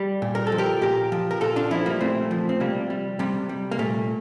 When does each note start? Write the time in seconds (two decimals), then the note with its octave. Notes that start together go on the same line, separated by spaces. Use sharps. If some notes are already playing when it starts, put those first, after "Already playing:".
Already playing: G3
0.22 A#2
0.35 A#4
0.47 A4
0.52 F3
0.58 G4 A#4
0.81 A#2 G4 A#4
1.12 F3
1.31 A#4
1.41 A#2 F4 A4
1.56 D4 F4
1.71 F3 C4 E4
1.86 G3 A#3
2.01 A#2 A3 C4
2.31 F3
2.49 C4
2.60 C3 G3 A#3
2.90 G3
3.19 C3 G3
3.49 G3
3.71 A#3
3.79 A#2 A3